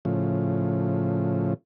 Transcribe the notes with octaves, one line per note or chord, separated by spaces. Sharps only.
A2 C#3 F3